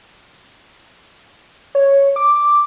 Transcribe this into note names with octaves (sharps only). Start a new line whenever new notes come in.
C#5
D6